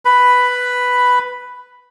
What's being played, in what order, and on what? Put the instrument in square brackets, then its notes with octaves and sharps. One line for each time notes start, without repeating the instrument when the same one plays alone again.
[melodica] B4 B5